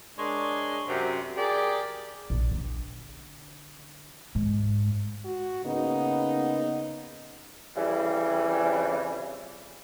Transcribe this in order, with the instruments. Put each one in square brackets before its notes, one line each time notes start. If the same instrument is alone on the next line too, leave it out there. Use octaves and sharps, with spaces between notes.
[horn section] G#3 D4 A#4 C#5 C6
F#2 C3
G4 G#4 A#4 D5
[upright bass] A#1
D3
G#2
[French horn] F#4
[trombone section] C#3 A#3 B3 [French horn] D#4
[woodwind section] F2 C#3 E3 G3